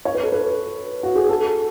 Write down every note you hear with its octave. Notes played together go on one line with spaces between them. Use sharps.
C#5
B4
A4
B4
F#4
G#4
A4